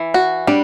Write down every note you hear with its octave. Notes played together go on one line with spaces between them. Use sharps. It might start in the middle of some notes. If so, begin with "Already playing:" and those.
Already playing: E3
F#4
G3 D4